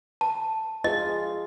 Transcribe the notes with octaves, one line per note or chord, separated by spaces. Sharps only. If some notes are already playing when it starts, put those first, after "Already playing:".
A5
F4 G#4 D#5